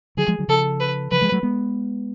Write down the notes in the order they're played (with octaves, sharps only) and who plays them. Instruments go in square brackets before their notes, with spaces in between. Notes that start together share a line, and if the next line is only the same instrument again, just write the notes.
[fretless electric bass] D3 F#3 [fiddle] G#4
[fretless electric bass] F3 G#3
D3 F#3
[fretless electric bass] C#3 F3 [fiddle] A4
[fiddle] B4
[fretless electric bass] C#3 F3 [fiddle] B4
[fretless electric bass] F3 G#3
F#3 A3
G#3 B3